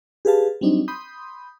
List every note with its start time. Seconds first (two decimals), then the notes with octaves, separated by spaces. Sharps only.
0.25 G4 G#4 B4 F5 A5
0.61 F#3 G3 C4 D4 D#4
0.88 B5 C6 D#6 G6